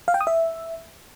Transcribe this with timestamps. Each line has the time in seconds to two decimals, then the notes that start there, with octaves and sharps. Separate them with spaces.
0.08 F5
0.14 G5
0.21 D#6
0.27 E5